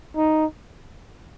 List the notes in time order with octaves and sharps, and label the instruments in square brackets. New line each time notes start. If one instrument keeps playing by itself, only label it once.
[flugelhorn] D#4